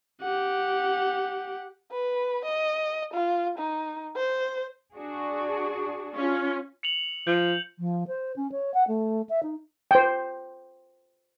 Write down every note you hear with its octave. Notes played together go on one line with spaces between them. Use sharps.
G4 F#5
B4
D#5
F4
D#4
C5
D4 F#4 G#4
C#4 F4
C#7 F7 F#7
F3 G6
F3
C5
C#4
C#5
F#5
A3
E5
D#4
C5 G5